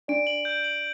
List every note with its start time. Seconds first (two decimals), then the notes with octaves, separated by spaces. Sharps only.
0.08 D4 D5 D7
0.27 F#7
0.45 G6
0.64 F#7